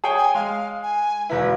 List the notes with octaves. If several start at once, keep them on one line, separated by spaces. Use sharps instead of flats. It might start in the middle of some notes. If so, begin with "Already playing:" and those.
G#4 C#5 G5
G#5
G#3 F5
G#5
E1 E4 B4